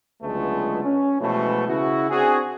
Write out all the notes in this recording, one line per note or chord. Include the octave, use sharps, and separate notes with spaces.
C#2 D3 F#3 G#3 A3 B3
C#4
B2 E3 F3 G#3 A3
C#3 E4 F#4
C4 D4 F#4 G#4